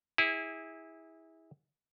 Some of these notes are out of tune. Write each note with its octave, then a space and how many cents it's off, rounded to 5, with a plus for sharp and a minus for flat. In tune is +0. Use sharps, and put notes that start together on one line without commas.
E4 -20 G#4 -25